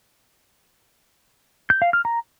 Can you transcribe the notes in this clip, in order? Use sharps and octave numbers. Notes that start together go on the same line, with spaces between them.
G6
F5
F6
A#5